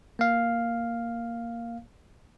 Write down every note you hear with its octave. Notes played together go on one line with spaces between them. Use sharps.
A#3 F5